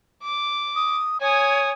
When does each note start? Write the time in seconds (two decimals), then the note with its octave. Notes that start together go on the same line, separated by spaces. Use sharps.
0.23 D6
0.76 D#6
1.21 C#5 G#5 D#6